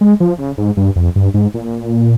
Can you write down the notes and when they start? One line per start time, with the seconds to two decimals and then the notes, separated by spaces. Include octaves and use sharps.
0.01 G#3
0.20 F3
0.38 C#3
0.58 G#2
0.77 G2
0.96 F2
1.16 G2
1.34 G#2
1.54 A#2